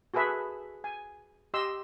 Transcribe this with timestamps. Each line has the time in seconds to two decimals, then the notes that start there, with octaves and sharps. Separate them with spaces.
0.14 F#4 G#4 A4 B4 E5
0.84 G#5
1.54 G4 D#5 C6 E6